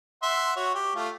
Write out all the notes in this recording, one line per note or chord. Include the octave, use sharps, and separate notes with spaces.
E5 F#5 C6
F#4 C#5
G4
A3 F4